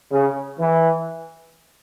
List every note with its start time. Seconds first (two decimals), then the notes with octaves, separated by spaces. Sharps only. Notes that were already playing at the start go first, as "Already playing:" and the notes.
0.11 C#3
0.59 E3